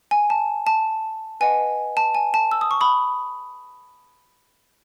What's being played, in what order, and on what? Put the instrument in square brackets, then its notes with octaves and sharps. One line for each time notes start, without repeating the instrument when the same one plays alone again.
[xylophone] G#5
A5
A5
B4 D#5 F#5 G#5
A5
G#5
A5
E6
D#6
C#6
B5 D#6